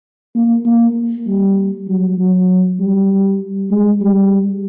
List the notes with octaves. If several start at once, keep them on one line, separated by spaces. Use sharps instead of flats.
A#3
A#3
G3
F#3
F#3
G3
G#3
G3